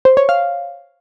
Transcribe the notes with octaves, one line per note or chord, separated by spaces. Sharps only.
C5
C#5
F5